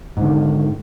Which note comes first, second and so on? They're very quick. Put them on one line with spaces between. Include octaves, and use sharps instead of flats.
G#2 D3 D#3